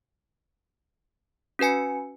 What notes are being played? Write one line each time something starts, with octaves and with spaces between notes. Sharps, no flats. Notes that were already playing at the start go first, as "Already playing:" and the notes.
C#4 F#4 B4 G#5 C#7